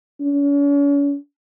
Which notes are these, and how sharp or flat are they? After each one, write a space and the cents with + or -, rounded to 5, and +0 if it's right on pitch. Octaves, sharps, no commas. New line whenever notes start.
C#4 +40